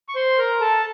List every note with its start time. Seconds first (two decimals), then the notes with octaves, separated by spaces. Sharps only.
0.09 C#6
0.16 C5 C6
0.38 A#4 A#5
0.61 A4 A5